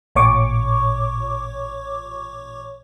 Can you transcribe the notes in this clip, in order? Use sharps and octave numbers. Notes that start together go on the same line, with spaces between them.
A1 A#2 C#5 C#6 D6